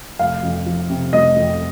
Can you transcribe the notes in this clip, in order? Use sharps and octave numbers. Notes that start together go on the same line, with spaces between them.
F1 F5
F2
F3
C3
F1 D#5
F2